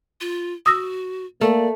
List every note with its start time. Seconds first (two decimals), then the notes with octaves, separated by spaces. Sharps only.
0.21 F4
0.66 F#4 D#6 E6 A#6
1.41 A3 A#3 D5